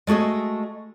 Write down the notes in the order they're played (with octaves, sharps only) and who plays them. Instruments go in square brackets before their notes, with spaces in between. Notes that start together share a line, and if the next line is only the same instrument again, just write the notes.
[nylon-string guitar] G#3 A3 F#4 G#4 D#5